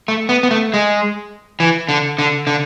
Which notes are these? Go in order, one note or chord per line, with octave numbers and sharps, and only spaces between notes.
A3
B3
B3
A3
G#3
E3
D3
D3
D3